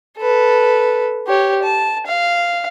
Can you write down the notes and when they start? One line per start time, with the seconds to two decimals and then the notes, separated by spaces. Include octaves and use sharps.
0.18 A4 B4
1.27 G4 C#5
1.63 A5
2.06 F5